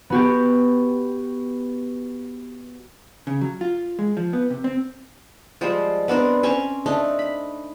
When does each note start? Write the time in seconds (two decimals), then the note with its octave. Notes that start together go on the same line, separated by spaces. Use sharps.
0.10 B3 F#4 G4
3.27 C#3
3.41 F#3
3.61 F4
3.99 G#3
4.17 F3
4.33 B3
4.50 C3
4.64 C4
5.61 F3 G3 G#3 C5
6.08 B3 C4 D4 A#4
6.43 C4 C#4 C#6
6.86 A3 D4 D#4
7.19 B5